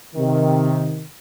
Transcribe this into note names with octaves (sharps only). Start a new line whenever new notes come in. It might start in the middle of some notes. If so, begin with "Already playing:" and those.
C3 D#3